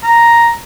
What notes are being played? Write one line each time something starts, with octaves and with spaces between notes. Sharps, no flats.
A#5